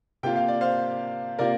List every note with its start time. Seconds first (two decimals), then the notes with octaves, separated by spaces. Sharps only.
0.23 C3 A#3 F4 G5
0.36 F5
0.48 D5
0.61 C5 F5
1.39 C3 A#3 F4 A#4 D5